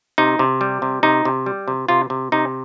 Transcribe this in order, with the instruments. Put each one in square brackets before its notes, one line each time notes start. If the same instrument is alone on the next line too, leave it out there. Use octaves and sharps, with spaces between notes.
[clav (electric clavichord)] C3 D#4
C3
G3
C3
C3 D#4
C3
G3
C3
C3 F4
C3
C3 D#4